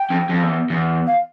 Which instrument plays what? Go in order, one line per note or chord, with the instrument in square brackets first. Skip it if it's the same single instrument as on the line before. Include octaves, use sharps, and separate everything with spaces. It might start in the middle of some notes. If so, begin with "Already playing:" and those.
Already playing: [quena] G5
[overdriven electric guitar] F2
F2
E2
E2
[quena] F5